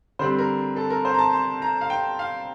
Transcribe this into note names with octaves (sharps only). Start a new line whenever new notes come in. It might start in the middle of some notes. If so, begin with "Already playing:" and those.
D3 G3 C4 C5
A#4
A4
A#4
C5
A#5
A5
C6
A#5
F5
G5
F5